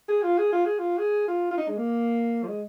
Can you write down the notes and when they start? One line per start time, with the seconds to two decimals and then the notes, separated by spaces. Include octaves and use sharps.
0.08 G#4
0.23 F4
0.38 G#4
0.53 F4
0.66 G#4
0.79 F4
0.98 G#4
1.28 F4
1.51 F4
1.58 D#4
1.68 G#3
1.77 A#3
2.43 F3
2.47 G#3